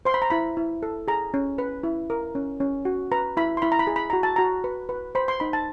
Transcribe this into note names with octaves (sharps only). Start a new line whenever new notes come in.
C5 C6
B5
A#5
E4 B5
E4
A4
G#4 A#5
C#4
B4
E4
A#4
C#4
C#4
F#4
B4 A#5
E4 B5
C6
E4 B5
A#5
B5
G#4
B5
F#4 A#5
A5
F#4 A#5
B4
B4
C5 B5
C6
D#4 B5
A5